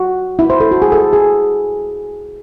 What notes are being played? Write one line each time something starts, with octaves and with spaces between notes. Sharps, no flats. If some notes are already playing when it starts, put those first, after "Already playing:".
Already playing: F#4
E4
C5
A4
F#4
G#4
A4
G#4